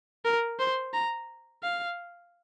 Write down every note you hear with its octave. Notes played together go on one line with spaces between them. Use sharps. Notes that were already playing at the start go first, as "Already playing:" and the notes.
A#4
C5
A#5
F5